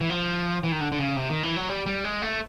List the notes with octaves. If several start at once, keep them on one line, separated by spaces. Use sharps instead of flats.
E3
F3
E3
D#3
D3
D3
C#3
C3
D#3
E3
F#3
G3
G3
G#3
A3